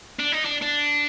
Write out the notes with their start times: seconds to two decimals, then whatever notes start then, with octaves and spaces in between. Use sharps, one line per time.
0.19 D4
0.32 D#4
0.45 D4
0.62 D4